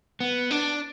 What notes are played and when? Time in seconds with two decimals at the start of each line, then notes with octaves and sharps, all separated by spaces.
0.20 B3
0.51 D4